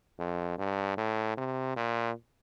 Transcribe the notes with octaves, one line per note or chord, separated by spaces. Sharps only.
F2
G2
A2
C3
A#2